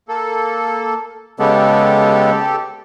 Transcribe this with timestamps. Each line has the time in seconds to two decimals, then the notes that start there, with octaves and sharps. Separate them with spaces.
0.08 A#3 A4
1.39 C#3 G#3 B3 G4 A4